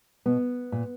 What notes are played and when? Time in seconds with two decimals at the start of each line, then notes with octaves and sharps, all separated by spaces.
0.26 B2 B3
0.72 A#2